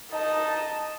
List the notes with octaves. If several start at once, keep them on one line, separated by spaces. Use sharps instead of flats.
D#4 D#5 A5